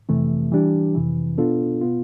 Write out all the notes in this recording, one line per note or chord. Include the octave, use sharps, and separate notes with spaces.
F2 C3 E3 A3
E3 G3 D4 G4
F2 C3 E3
B2 B3 D4 F4 A4
B2 B3 F4